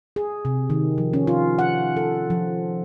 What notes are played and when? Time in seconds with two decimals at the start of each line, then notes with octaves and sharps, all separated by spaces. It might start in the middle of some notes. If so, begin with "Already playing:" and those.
0.16 G#4
0.45 C3
0.70 D#3
0.98 F3
1.13 C#4
1.27 F4
1.59 F#5
1.97 A4
2.30 F3